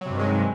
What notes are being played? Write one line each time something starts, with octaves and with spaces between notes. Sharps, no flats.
G2 C3 D#3 F#3 G#3